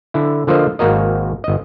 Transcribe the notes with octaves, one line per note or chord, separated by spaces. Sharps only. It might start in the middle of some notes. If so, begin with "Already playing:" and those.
D3 E4
D3 F3 A#3 C5 D#5
G#1 A#3 F#4 A#4 D#5
G1 D#5